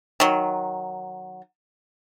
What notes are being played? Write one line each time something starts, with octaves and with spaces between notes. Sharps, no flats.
D#3 F#3